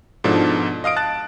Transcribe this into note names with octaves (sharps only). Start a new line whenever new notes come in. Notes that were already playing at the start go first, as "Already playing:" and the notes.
G#2 B2 F3 D4 A4
D#5 F5 D#6 D7
A5 F#6 A6